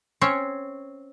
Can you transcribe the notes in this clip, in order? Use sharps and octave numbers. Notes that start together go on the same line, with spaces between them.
C4 C#4 C#5